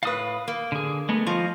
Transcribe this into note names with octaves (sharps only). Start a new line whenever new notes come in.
A2 B4 F5 D#6
A#3
D3 G#4
G#3 A3 B3
F3 D#5 F5 C#6